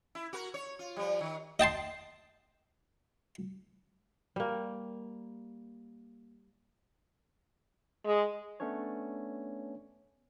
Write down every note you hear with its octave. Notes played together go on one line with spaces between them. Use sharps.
E4
F#4 A#4
C#5
F4
F3 G3
D#3
D#5 G5 A5 C6
G3 A#3
G#3
A3 B3 C#4 D4 C#5